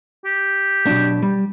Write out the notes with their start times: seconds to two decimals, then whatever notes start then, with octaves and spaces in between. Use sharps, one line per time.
0.25 G4
0.87 B2 F#3 D4
1.22 G3